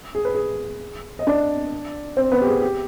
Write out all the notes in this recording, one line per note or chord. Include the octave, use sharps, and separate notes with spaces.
G#4
B4
G#4
D#5
D4 D5
C4 C5
B3 B4
G4
G#4
G4